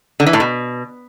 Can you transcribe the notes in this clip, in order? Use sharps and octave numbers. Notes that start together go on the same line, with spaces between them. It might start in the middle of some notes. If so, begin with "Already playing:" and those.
D3
E3
A2
B2